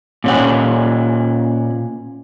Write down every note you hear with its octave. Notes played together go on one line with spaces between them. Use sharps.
A#2 C#4 F#5